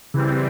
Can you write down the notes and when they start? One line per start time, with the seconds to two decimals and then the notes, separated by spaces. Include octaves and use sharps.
0.14 C#3 E3 G3 C4